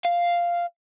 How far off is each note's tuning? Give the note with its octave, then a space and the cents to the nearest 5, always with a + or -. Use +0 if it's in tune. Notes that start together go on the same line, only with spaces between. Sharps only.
F5 -5